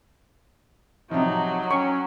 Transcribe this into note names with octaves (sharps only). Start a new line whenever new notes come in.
C3 F3 F#3 D#4
C#4 G5 C#6